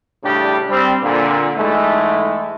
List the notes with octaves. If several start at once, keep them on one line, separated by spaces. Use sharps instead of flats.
A2 C#3 G3 D4 G4
G3 C4
A#2 D3
G#2 E3 G#3 A3